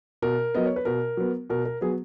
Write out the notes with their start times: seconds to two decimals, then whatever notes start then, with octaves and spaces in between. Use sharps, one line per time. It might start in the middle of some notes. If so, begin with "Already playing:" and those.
0.22 B2 A#4
0.55 F#3 B3 D#5
0.66 C#5
0.76 B4
0.85 B2 A#4
1.17 F#3 B3
1.50 B2 A#4
1.65 A#4
1.81 F#3 B3 G#4